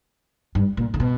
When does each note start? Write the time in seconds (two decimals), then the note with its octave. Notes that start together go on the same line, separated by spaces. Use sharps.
0.55 G2
0.77 A#2
0.94 C#3
1.00 B2